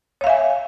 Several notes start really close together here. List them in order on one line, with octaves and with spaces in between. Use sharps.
C#5 F5 E5 G#5